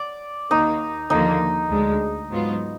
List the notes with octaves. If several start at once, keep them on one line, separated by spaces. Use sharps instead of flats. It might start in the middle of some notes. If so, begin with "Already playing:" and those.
Already playing: D5
D#2 D#3 A#3 D#4
D#2 D3 F3 A#3 D#4
D2 D3 G#3
G#2 F#3 B3 F4